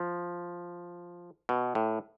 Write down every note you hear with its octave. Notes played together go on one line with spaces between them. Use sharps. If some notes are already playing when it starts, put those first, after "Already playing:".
Already playing: F3
B2
A2